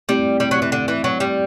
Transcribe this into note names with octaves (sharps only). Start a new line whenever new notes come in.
G3 A3 C4 E4
G3
F#3
E3
D3
E3
F#3
G3